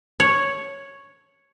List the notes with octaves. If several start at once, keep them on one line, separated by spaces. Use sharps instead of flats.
C#5